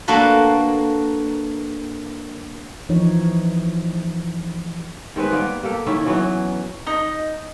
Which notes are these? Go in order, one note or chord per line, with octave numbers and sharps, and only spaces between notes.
A#3 D4 F#4 A4 B4
E3 F3 D#4 C#5
D#3 G#3 C4 B4
G3 A#3 B3 D5
A#3 G4 A4
D#3 C#4 E4 E5
E3 F#3 B3
D#4 D#5